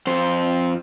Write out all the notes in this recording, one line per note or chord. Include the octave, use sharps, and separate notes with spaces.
F2 C5